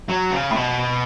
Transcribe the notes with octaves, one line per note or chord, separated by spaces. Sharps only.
F#3
C#3
A2
B2